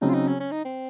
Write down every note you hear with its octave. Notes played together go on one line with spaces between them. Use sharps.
C#3 F#3 C4 D#4
F4
D#4
C#4
C#4
D#4
C4